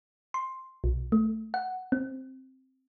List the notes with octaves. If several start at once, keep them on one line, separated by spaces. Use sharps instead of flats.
C6
B1
A3
F#5
C4